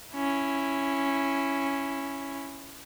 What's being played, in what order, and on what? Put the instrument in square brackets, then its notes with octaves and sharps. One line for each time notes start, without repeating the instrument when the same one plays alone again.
[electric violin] C#4 E4